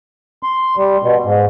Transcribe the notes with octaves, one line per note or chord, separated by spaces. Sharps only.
C6
G3
B2
G#2